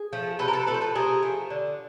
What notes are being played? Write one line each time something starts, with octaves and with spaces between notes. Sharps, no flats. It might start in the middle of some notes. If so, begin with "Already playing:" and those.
Already playing: G#4
F3 A3
C3 A4 B4
A#4
A4 B4
F3 A3 A4 B4
C5
A4 B4
C3 G#4 A#4
F3 A3
D3